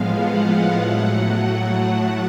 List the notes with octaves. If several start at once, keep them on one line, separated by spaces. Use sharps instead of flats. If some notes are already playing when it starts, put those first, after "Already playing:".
Already playing: A2 F3 G#3 B3 F5
F#5
F#5
A2 F#3 A3